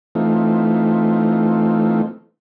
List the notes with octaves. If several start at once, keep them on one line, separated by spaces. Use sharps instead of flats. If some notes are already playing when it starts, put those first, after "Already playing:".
E3 A3 C4 D#4 F4